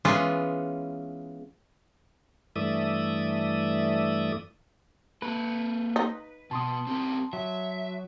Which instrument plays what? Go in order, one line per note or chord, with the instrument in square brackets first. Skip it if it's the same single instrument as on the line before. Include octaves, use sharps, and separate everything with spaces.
[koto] E3 G#3 B3 C#4 F4 G#4
[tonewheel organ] G2 E3 A3 D5 E5 D#6
[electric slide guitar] A#3 A4 [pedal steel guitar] B4
[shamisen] D#4
[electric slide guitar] B2 B3 [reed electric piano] A5 C6 D#6
[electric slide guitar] C4 G4 A#4
[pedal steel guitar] F#3 [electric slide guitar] E5